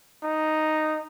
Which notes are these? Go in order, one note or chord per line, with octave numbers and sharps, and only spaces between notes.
D#4